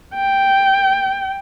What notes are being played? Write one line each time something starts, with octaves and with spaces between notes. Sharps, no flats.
G5